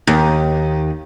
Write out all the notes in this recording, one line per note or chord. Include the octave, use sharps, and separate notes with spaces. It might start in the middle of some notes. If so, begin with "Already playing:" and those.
D#2